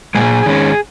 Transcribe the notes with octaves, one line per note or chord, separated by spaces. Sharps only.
A#2 G#3 G#4
D#3 G#3 C#4